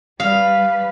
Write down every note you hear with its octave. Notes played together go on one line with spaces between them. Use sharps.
G3 B4 F5